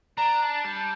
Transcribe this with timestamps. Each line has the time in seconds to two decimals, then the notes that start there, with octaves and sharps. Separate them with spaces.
0.17 D4 A#5
0.42 A5
0.64 G3 A5